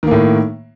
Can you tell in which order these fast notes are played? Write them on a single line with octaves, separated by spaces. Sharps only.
D#3 A#3 A2